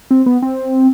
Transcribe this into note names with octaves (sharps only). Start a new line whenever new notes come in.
C4
B3
C4